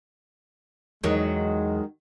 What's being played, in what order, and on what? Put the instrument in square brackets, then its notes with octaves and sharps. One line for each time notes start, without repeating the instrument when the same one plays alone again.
[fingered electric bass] E2 [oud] D#3 F#3 [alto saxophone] G#3